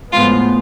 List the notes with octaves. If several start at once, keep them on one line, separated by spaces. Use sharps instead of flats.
A2 F3 G#3 B3 F4